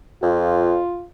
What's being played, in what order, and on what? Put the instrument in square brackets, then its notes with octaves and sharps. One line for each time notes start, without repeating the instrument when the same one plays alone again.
[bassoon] F2 [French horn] F4